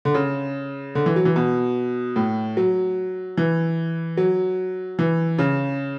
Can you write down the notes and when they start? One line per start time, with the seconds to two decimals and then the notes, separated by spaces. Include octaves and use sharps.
0.05 D3
0.14 C#3
0.95 D3
1.06 E3
1.16 F#3
1.25 E3
1.36 B2
2.16 A2
2.57 F#3
3.37 E3
4.17 F#3
4.99 E3
5.38 C#3